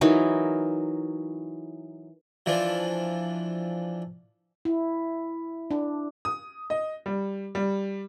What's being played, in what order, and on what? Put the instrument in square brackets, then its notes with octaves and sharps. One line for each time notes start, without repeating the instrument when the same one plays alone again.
[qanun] E3 F#3 D#4 A#4
[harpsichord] E3 F3 D4
[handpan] E4
D4
[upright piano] D#6
D#5
G3
G3